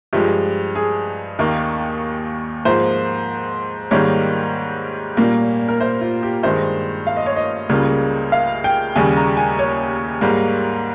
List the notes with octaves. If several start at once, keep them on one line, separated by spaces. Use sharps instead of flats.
G2 F3 G#3 G4
G#4
D#2 D#3 A#3
G#2 F3 A#3 C5
G#2 D#3 G3 A#3 C#5
A#2 G3 A#3
A#4
C5
F4
G4
G2 D#3 G#3 C5
F5
D#5
C#5
D#5
C#2 C#3 G3 A#3
F5
G5
D#2 C#3 G3 G#5
A#5
G#5
C#5
G#2 G3 A#3